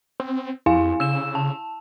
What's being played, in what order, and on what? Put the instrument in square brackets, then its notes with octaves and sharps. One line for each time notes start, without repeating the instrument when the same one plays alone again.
[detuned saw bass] C4
[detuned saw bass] F2 [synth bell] E4 F5 G#5
[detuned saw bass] C#3 [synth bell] E6 E7
[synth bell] A5